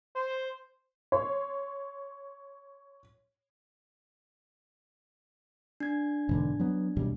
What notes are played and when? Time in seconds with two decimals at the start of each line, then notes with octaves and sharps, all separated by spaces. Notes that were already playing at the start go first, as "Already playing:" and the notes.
0.16 C5
1.12 C#5 C6
5.80 D4 G#6
6.29 E1 G#2 D3
6.59 F#3 B3
6.97 D#2 B2 G3